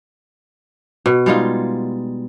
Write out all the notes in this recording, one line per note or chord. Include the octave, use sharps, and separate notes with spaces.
B2
G3 G#3 D#4 F4